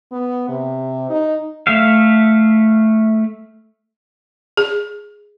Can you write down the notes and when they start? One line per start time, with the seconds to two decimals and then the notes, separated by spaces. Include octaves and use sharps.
0.12 B3
0.49 C3
1.09 D#4
1.67 A3 E5 F5
4.57 G#4